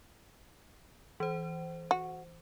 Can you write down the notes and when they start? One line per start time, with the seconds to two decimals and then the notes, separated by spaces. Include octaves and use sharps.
1.20 E3 C5
1.91 F#4